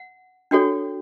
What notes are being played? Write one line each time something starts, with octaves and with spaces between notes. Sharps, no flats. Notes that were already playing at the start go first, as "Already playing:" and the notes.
Already playing: F#5
D4 F#4 A4 C#5 G5